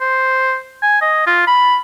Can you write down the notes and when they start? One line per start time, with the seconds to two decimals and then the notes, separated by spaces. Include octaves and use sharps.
0.01 C5
0.82 G#5
1.01 D#5
1.27 F4
1.47 B5